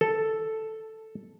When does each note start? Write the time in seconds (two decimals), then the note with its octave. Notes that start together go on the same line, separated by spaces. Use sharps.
0.01 A4